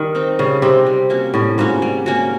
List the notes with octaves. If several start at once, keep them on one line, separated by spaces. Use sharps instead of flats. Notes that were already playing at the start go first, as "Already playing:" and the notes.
Already playing: D#3 G3
C4 D#4
C#3 G3
C3 C4 D#4
G3
A#3 C#4 F#4
A2 G3
G#2 A#3 C#4 F#4
G3
A#3 C#4 F#4